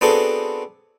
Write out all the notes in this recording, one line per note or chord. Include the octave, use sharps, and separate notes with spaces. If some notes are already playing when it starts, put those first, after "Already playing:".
B3 C4 D4 F#4 G#4 A4